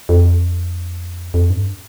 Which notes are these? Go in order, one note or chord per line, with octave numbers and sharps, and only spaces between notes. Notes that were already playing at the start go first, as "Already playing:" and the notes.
F2
F2
G2